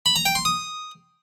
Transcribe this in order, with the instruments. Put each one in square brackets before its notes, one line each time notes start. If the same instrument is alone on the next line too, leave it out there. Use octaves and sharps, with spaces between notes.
[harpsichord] B5
A#5
G5
C6
D#6